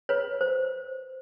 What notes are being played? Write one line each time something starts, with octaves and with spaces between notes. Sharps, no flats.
B4 C#5
C5